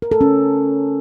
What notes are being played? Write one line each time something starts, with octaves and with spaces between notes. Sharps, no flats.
A#4
A4
C#4